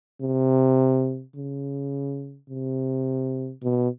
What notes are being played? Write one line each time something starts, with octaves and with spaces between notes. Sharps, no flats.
C3
C#3
C3
B2